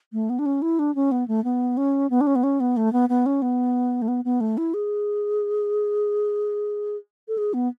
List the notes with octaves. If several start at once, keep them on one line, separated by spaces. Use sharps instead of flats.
A3
B3
D4
C#4
E4
D4
C#4
B3
A3
B3
C#4
B3
D4
C#4
B3
C#4
B3
A3
B3
B3
C#4
B3
A3
B3
B3
A3
E4
G#4
A4
G#4
B3